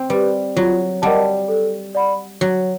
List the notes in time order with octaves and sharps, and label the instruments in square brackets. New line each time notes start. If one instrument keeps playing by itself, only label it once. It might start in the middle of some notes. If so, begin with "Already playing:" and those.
Already playing: [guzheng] C4
[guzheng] G3 [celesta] G4 B4
[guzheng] F#3 [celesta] F4
[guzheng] G3 [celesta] A#4 D#5 F#5 A5
[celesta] A4
D5 F#5 B5
[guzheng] F#3 [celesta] F#4